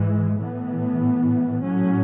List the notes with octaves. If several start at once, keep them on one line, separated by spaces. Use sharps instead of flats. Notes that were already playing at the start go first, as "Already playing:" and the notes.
Already playing: G#2 E3 G#3
A2 E3 B3
A2 F#3 C#4